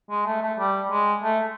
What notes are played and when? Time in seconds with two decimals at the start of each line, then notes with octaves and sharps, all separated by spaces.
0.10 G#3
0.26 A3
0.42 A3
0.58 G3
0.91 G#3
1.23 A3